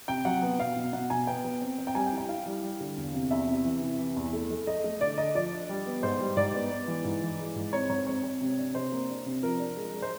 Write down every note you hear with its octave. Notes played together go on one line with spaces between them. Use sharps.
C3 G5
F#3 F#5
B3
B2 F5
B2
B2 F#5
B2 G#5
B3 G5
B3
C4
C4
G5
G3 G#5
G5
E4
G5
E4 F5
G3
G3
D3
E2
C3
E2 E5
C3
E3
C3
E3
E2
A3
A3
A3 D#5
A3
D3 D5
D4 D#5
F3 D5
D4
G3
B3
G#2 C5
G3
G#2 D5
B3
B3
E3
G#2
E3
G#3
G#2
C4 C#5
G#2 C#5
C4 C#5
C4
C3
D4
C3 C5
A#3
D4
C3
F3 A#4
D4
G#3
G#3
C5